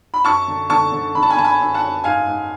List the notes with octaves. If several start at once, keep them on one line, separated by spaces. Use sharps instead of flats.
B5
F#2 A5 C#6
D3
D3 A5 C#6
D3
D3 B5
A5
G#5 B5
D3 A5
G#5 B5
F#2
F#5 A5
F#2
G#2 F5 G#5
G#2